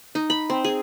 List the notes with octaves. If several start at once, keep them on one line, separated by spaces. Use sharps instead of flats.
D#4
B5
C4
G#4